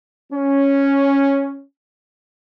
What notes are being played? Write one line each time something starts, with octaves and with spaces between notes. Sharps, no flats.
C#4